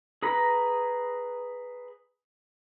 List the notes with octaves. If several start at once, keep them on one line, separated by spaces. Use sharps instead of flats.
G#4 B4 A#5 B5